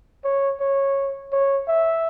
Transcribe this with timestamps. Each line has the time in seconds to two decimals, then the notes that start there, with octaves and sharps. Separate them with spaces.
0.24 C#5
0.60 C#5
1.32 C#5
1.68 E5